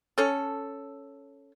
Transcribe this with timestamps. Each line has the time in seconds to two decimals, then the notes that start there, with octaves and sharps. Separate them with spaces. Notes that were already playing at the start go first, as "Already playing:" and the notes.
0.18 C#4 A4